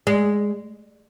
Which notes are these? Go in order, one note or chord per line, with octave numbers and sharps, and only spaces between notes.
G#3